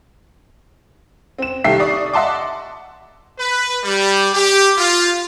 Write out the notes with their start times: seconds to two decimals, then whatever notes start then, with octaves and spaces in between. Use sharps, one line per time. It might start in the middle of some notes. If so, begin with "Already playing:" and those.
1.38 C4 E7
1.64 C2 D#3 G4 A4 E5 C7
1.80 D5 C#6 D#6
2.13 D#5 E5 F#5 A5 C6 D6
3.39 B4
3.84 G3
4.33 G4
4.78 F4